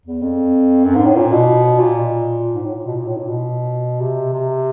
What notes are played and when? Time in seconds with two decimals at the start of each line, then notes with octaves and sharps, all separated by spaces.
0.05 E2
0.22 F2
0.84 F#2
0.95 G#2
1.06 A2
1.16 A#2
1.32 B2
1.79 A#2
2.54 G#2
2.65 A2
2.75 A#2
2.86 B2
2.96 A#2
3.06 A2
3.17 A#2
3.28 B2
4.01 C3
4.33 C3